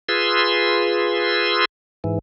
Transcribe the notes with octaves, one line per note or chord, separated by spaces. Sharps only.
F4 G#4 B4 C6 E6
G#2 E3